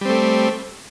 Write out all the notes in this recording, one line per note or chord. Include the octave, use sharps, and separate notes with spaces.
G3 A3 C4